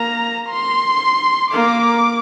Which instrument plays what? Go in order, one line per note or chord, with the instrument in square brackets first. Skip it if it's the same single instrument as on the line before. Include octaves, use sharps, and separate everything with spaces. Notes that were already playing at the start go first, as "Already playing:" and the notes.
Already playing: [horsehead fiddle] A#3 [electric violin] A#5
[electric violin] C6
[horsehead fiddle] A#3 [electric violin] D6